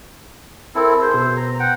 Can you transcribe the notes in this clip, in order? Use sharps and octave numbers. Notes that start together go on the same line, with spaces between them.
C4 E4 A4 A#4
G#4 C5
B2
A#5
F#5 G5